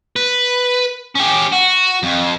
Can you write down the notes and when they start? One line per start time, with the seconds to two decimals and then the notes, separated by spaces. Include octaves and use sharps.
0.16 B4
1.15 C#4 G4
1.52 F#4
2.03 F2